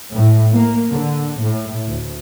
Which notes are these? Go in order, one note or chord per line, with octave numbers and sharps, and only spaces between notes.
A2
A#3
D3
A2
D2